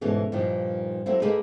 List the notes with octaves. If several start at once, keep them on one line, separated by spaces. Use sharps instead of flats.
E2 G#2 B2 E3 A3 C#4
G2 A#2 D#3 F3
F#3 G3 A3 A#3 C4 E4
A3 A#3 D#4 G#4 A#4 B4